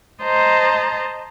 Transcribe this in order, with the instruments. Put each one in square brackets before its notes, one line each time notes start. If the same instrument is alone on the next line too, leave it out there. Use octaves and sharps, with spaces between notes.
[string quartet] C5 D#5 A5 A#5